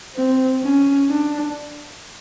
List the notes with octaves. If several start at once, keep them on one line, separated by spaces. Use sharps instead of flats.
C4
C#4
D4